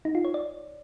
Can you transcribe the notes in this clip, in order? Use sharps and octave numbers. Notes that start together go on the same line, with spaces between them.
D#4
F4
C#5
D5